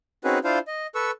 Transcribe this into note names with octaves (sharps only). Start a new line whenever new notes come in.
C4 C#4 D#4 F#4 G#4 B4
D4 E4 F4 C5 F5
D#5
A4 B4 C#6 E6